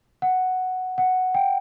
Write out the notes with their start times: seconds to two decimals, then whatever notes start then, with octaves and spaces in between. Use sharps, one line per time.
0.22 F#5
0.98 F#5
1.35 G5